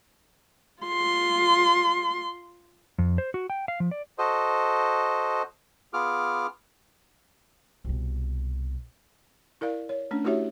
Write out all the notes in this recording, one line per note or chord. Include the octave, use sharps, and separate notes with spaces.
F4 C6
F2
C5
F#4
G5
F5
F3
D5
F#4 A4 C5 D#5
B3 F4 G#4 D6 F6
C2 B2
E4 A#4 D5 F5
C#5
A3 C#4 D4
A3 E4 F#4 G4 C#5 E5